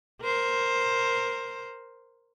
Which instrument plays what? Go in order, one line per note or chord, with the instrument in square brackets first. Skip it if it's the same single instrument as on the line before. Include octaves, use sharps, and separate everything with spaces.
[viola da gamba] A#4 C5